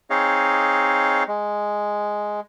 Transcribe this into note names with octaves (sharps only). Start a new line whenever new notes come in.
C4 D#4 G#4 C#5 D#5 F5
G#3